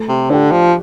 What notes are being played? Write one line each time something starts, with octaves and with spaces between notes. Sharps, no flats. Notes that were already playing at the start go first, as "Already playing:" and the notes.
Already playing: A3
C3
D3 D4 G4
F3